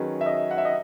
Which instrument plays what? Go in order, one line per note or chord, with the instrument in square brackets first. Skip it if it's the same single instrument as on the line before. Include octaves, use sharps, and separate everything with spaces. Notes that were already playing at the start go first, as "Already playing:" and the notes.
Already playing: [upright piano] D#3 F#3 C#4 G#4 B4
[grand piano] E5
D#5
F#5
E5
D#5